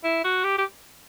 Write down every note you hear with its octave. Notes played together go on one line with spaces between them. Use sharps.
E4
F#4
G4
G4